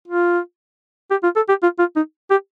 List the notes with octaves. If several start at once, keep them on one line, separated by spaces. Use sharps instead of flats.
F4
G4
F4
A4
G4
F4
F4
D#4
G4